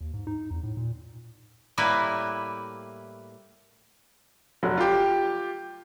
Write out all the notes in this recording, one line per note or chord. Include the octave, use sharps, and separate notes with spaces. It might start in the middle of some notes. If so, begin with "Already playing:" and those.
D#2
G#2
D#4
E2
A2
A#2
A2 G3 A#3 E4 B4
F1 F#3
F4 G4